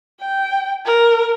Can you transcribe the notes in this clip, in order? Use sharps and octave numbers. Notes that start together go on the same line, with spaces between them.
G5
A#4